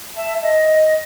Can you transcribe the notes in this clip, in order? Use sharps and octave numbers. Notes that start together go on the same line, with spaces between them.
E5 A5
D#5